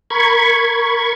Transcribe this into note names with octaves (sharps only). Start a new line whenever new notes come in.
A#4 B5 C#6 G#6